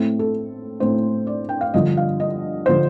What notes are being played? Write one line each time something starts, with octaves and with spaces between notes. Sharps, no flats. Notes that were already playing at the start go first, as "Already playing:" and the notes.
Already playing: A2 A3 C4
A4
A2 A3 C4 C5
D5
G5
F5
G2 D3 F3 D#5
F5
D#5
D3 F3 C5